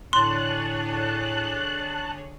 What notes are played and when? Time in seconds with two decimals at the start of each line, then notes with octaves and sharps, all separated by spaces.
0.13 A2 D3 G#4 C#5 A5 C6 F#6